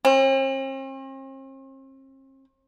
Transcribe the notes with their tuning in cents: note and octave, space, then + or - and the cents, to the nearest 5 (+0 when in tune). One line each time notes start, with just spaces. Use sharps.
C4 +45